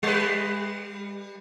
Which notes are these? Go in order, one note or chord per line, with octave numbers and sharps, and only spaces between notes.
G3 B4